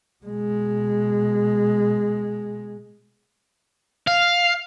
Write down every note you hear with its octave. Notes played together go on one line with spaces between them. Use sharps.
B2 G#3
F5